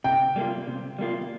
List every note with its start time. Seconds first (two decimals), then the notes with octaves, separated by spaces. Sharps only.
0.04 C3 G5
0.36 G3 A#3 F4
0.68 C3
0.99 G3 A#3 F4